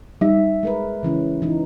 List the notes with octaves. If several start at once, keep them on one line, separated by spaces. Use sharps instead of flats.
G3 D#4 E5
G#3 A#4 B4
C#3 E3 C#4
E3 D#4